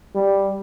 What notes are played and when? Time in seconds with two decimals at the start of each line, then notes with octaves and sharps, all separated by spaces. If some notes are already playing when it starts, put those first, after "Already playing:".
0.15 G3